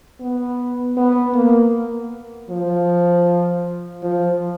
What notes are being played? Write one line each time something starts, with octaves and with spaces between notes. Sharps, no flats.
B3
B3
A#3
F3
F3